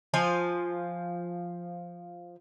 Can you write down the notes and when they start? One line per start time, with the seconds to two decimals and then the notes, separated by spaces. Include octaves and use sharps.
0.14 F3 F5 G#5